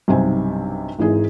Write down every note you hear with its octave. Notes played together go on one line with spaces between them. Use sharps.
B1 G2 C3 D#4 C5 G#5
G#1 G#2 E3 E4 G#4